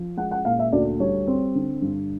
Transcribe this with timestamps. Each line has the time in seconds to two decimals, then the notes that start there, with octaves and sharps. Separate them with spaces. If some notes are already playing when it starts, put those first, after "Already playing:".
Already playing: F3
0.17 G#3 F#5
0.31 F#5
0.45 A#2 F5
0.59 E5
0.72 D2 D5
0.99 G3 C#5
1.27 C4
1.55 D3
1.82 G2